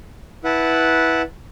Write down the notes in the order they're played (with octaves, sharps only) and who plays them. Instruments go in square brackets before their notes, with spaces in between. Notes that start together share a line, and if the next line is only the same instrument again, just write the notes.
[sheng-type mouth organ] E4 B4 F#5 A5